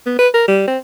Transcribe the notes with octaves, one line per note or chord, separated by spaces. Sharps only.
B3
B4
A#4
G3
C4